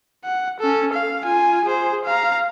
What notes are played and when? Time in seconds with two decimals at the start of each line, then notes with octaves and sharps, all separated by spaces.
0.25 F#5
0.60 C#4 A4
0.93 F5
1.25 F4 G#5
1.65 G#4 C5
2.05 F5 A#5